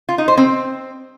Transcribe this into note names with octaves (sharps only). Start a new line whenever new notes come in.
F4
D#4
C5
C4